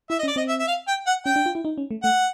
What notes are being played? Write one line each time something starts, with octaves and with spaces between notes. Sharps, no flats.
E4 E5
D#5
C#4
D5
C4 D#5
E5
E5
F5
G5
F#5
C#4 G5
D4
F4
E4
D#4
C#4
A3
A3 F#5